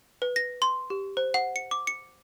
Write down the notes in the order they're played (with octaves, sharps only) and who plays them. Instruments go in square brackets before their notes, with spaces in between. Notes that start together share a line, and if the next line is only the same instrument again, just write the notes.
[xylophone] B4
A#6
C6
G4
C5
F#5
C#7
D6
C#7